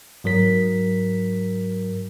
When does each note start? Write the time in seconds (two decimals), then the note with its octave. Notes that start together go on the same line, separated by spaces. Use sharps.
0.24 G#2 F#3 A#4 B6